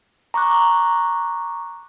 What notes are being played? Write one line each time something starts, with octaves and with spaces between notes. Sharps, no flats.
A#5 C#6 D6 F#6